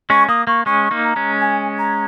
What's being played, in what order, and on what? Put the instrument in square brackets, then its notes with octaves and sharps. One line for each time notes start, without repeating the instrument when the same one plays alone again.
[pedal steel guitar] G#3 C#4 [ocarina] C#6
[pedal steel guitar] A#3 [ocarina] D#6
[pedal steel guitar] A#3 [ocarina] C#6
[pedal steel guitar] G#3 C#4 [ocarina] C#6
[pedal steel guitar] A#3 D#4
[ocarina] A#5
[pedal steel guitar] G#3 C#4
[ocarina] G#5
A#5